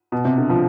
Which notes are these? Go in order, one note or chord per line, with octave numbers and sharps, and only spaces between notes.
B2
C3
D3
F3